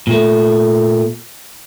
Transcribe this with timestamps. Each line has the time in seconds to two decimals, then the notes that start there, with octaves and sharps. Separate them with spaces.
0.07 A#2 A3